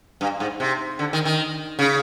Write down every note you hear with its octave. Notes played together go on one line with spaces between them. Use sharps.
G2
G#2
C3
D3
D#3
D#3
C#3